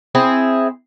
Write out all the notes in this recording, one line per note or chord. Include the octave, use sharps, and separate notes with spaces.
C4 E4 G#4